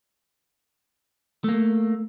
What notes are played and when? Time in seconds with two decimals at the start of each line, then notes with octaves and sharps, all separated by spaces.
1.44 A3 A#3